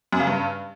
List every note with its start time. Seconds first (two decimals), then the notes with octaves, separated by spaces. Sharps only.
0.13 F#2
0.20 C#3
0.27 G2